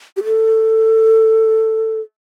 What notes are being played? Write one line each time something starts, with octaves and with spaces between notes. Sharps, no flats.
G4
A4